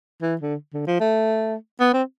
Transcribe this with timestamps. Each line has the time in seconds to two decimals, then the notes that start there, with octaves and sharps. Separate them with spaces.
0.22 E3
0.41 D3
0.74 D3
0.87 F3
1.00 A3
1.80 B3
1.93 C4